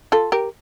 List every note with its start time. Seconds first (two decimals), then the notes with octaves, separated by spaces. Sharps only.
0.12 F4 A4
0.32 G4 A#4